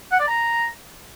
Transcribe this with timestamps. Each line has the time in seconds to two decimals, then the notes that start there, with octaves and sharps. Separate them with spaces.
0.12 F#5
0.20 D5
0.28 A#5